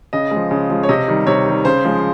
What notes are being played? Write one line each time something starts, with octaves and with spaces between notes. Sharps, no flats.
C#3 D#5
F3 G#3
C#3
F3 G#3
C#5
C3 D#5
D#3 G3
C3 C#5
D#3 G3
C#3 C5
F3 G#3